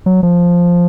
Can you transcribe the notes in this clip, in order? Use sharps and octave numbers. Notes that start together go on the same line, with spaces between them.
F#3
F3